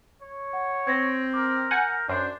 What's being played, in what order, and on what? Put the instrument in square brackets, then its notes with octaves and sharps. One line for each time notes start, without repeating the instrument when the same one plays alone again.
[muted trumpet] C#5
[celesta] F#5
[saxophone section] C4 [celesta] G#6 A#6
[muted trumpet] A#4 [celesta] D6
[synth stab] F#5 G#5 [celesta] G6
[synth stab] F#2 [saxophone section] D4 [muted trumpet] C5